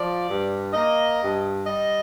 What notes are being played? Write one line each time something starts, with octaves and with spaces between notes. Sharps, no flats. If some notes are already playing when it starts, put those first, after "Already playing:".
Already playing: F3 D5
G2
A#3 D#5
G2
G3 D#5